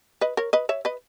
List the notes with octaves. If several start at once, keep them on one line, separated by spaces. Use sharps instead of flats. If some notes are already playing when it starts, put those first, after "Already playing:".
B4 D#5
A#4 C#5
B4 D#5
C#5 E5
B4 D#5